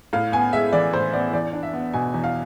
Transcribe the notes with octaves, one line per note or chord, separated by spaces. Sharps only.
A2 F5
B3 G#5
G#3 E5
E3 D5
A2 C5
B3 D5
E2 D5
D4
E5
B3
B2 G#5
E2
F5